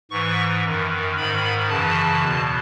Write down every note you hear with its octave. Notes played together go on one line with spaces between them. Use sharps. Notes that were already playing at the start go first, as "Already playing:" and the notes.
G#2 E3 C#6
F#2 D#3
G#2 D#3 B5
F#2 C#3 E3 A5
E2 B2